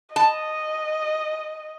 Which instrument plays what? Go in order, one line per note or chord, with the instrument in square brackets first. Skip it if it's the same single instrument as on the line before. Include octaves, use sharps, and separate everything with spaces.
[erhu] D#5 [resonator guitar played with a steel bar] A5